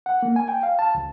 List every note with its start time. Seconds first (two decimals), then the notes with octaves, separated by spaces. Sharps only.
0.06 F#5
0.23 A#3
0.36 G#5
0.48 G5
0.63 F5
0.79 A5
0.95 C#2